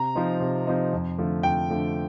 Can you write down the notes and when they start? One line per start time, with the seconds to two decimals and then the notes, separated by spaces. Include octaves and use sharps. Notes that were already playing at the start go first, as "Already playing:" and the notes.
Already playing: C3 A#5
0.15 F3 C4 D#4
0.40 C3
0.67 F3 C4 D#4
0.93 F2
1.18 D3 F3 A3
1.43 F2 G5
1.70 D3 F3 A3